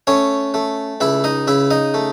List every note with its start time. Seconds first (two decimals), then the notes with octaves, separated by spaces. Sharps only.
0.07 A3 C#4 C#5
0.54 A3
1.01 C#2 E4 E5
1.24 D#4 D#5
1.47 C#3 E4 E5
1.71 D#4 D#5
1.94 A3